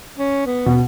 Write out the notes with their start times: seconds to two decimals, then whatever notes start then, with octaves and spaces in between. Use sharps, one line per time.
0.18 C#4
0.46 B3
0.66 B2 B3